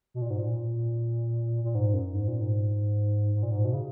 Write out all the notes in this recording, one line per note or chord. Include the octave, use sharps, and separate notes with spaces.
B2
A#2
G#2
A#2
A#2
G#2
F#2
G#2
A#2
G#2
G#2
A#2
G#2
B2
C#3